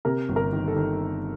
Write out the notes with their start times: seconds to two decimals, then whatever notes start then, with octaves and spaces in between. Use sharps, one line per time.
0.05 C3 A#4
0.29 G1
0.36 A#4
0.53 D#3
0.68 A4
0.76 D#3